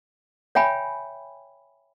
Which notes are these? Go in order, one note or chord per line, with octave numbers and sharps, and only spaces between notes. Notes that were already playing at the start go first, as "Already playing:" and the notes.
C#5 E5 G5 G#5 B5